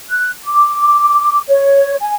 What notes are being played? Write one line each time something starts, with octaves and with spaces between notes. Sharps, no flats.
F#6
D6
C#5
G#5